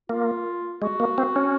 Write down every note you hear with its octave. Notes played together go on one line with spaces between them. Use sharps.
A#3 F4
G#3 F#4
A#3
C4
C#4